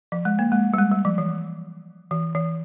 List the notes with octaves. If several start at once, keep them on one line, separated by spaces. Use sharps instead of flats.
F3
G#3
A#3
G#3
G3
G#3
G3
F3
E3
E3
E3